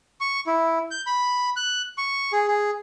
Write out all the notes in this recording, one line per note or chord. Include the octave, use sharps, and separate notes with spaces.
C#6
E4
G6
B5
F#6
C#6
G#4
G#4